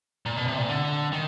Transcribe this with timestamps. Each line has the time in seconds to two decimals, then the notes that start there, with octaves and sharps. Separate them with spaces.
0.26 A#2
0.37 B2
0.48 C3
0.58 A#2
0.69 D3
1.13 D#3